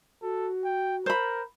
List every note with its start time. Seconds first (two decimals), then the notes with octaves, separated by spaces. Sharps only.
0.22 F#4 A4
0.64 G5
1.06 A#4 C5 B5